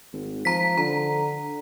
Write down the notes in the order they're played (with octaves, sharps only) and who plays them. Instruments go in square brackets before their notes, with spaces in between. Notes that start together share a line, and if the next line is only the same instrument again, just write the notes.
[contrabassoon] G#1
[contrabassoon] F3 [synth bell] A#5 B6
[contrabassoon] D3 [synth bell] A#5